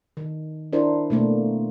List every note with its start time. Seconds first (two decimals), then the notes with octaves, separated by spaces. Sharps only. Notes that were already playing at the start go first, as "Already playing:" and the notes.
0.17 D#3
0.73 D4 E4 A#4 C5
1.10 B2 A3 A#3